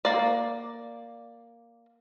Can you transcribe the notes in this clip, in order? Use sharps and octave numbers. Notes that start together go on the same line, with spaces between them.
A#3 D5